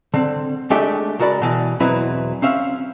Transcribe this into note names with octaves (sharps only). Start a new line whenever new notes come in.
D3 C4
G#3 A3 D4 G4 E5 G5
C#2 F#4 A#4 D5 B5
B2 E3
E2 B2 F#3 C4 E4 B4
C4 C#4 E5 F5